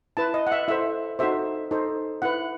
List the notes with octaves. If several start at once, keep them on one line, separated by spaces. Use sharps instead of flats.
E4 B4 A5
D#5
F#5
E5
E4 A4 C5 E5
D#4 F#4 A4 C5 E5
D#4 A4 C5
E4 B4 F#5